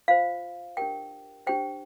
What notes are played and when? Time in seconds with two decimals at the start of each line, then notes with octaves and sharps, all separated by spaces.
0.08 F4 C5 F5
0.77 D4 G4 A#4 G5
1.47 D4 G4 C5 G5